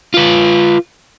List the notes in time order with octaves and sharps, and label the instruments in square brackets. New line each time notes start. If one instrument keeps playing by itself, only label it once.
[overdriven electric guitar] F4 B4